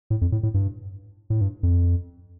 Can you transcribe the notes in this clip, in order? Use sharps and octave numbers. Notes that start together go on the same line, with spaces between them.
A2
F2
A2
A2
G2
A2
G2
F2